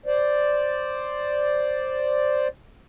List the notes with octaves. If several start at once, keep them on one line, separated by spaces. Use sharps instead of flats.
C5 D5